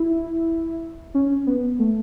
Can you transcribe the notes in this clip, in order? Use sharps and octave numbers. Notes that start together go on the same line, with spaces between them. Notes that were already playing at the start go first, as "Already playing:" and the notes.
Already playing: E4
C#4
B3
A3